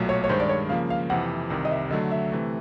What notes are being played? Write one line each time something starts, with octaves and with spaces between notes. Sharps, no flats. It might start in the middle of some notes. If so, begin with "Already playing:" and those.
Already playing: B1 A#2 F#3 A3
C#5
C#5
G2 D#3 G#3 C5
D5
C#5
C#3 F3 A#3 F5
F5
F2 C3 E3 F#5
C2 C3 D#3
D#5
E5
D3 F#3 A3 D#5
E5
C3 E3 A3